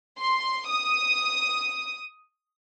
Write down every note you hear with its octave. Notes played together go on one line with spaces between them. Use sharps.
C6
D#6